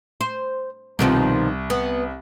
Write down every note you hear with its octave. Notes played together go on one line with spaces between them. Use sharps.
C5
C2 B2 D#3 F3
B3